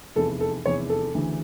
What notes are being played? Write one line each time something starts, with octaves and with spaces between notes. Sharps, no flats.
F1 E2 E3 A4
A4
F1 E2 E3 C#5
A4
D2 C#3 E3